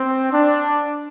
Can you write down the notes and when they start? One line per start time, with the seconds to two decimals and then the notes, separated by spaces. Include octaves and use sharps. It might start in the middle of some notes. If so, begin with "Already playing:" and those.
Already playing: C4
0.32 D4